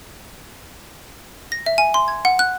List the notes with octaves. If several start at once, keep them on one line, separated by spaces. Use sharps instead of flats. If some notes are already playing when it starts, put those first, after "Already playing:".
A#6
E5
G#5
C6
G#6
F#5
F#6